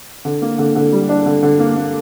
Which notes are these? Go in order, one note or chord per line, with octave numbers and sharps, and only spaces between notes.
D3
A#3
D3
D3
G3
D4
D3
D3
A#3
A#3